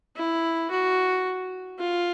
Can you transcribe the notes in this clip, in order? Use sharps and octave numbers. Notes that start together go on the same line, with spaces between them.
E4
F#4
F4